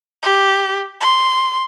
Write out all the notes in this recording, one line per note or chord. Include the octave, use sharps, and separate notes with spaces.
G4
C6